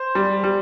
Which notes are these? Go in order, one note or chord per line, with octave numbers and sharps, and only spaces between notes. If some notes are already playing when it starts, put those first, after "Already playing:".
Already playing: C5
G3
G3